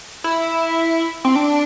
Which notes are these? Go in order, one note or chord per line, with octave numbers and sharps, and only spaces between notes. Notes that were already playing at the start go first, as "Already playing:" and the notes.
E4
C4
D4